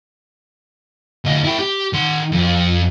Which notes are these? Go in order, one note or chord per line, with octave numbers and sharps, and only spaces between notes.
D2 D#5
E4 G5
G4
D#3 C6
F2